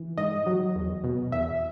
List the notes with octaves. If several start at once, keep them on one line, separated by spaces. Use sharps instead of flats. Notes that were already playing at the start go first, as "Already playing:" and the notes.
Already playing: E3
G#2 D#5
F#3
E2
B2
E2 E5